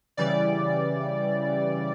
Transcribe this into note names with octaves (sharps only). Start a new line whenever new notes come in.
C#3 E3 G3 D5